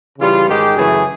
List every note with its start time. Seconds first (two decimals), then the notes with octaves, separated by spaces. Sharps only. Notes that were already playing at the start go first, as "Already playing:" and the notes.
0.19 C#3 E3 G3 F4
0.48 G#2 D#3 G#3 G4
0.76 F#2 C#3 E3 A3 G#4